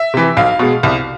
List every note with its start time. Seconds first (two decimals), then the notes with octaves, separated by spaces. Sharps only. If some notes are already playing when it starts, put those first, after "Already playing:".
Already playing: E5
0.14 C3 E3
0.37 B1 F5
0.59 B2 G#3
0.83 C2